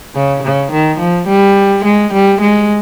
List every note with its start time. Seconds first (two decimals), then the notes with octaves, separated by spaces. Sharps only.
0.15 C#3
0.43 C#3
0.72 D#3
0.99 F3
1.28 G3
1.85 G#3
2.14 G3
2.41 G#3